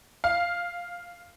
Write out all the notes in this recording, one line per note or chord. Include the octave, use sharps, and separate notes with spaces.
F5